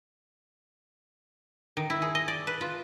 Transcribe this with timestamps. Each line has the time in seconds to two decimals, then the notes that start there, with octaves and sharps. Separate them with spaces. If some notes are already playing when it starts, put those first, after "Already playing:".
1.77 D#3
1.90 E4
2.02 G#4
2.15 D#5
2.28 D5
2.47 B4
2.61 F4